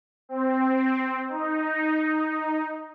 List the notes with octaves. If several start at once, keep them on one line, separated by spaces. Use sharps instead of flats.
C4
D#4